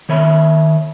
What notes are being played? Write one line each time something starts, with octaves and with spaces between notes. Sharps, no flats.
D#3 C#5 E5 B5